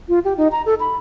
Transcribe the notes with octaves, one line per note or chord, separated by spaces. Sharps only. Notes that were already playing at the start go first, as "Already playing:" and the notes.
F4
G4
D#4
A#5
A4
B5